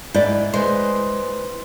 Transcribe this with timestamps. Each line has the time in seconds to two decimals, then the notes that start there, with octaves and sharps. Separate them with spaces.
0.14 G#2 E4 D5
0.54 G#3 B4 C5 C6